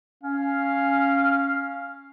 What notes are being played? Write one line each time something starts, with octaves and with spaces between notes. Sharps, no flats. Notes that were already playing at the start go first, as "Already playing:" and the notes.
C#4 F5